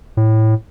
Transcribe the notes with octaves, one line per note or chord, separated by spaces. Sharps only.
A2